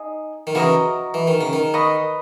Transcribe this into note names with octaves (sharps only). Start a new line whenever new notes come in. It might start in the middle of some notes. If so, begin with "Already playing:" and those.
Already playing: D#4 G#4 D#5
D#3
C#3 E3 F#4 A#4 D#5 A#5
E3
D#3
C#3
D#3
B4 D#5 A#5 C#6